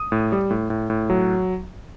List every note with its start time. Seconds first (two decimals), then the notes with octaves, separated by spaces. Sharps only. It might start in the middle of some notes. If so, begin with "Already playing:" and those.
Already playing: D#6
0.12 A2
0.32 G3
0.50 A2
0.70 A2
0.90 A2
1.10 F#3